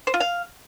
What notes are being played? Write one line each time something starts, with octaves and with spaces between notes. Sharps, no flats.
C5
F4
F5